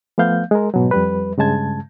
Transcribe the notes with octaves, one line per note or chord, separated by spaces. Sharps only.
F3 A3 B3 F5 G6
G#3 A#4
G#2 B2 F#3
F2 G3 B4
G2 C#3 G#3 A5 G#6